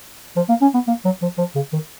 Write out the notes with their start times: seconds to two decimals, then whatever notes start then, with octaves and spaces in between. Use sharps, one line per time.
0.36 F3
0.49 A#3
0.62 C#4
0.74 B3
0.88 A#3
1.05 F#3
1.22 F3
1.38 F3
1.55 C#3
1.73 D#3